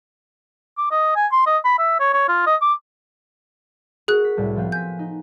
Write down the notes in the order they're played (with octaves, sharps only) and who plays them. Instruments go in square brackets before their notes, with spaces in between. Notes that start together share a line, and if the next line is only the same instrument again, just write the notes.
[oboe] D6
D#5
G#5
C6
D#5
B5
E5
C#5
C#5
F4
D#5
D6
[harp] F#4 A#4 [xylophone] G#4 F#6
[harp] B6
C2 A2 G3
F3 B3 C4
[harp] G#5 B6 [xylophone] G6
[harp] D#4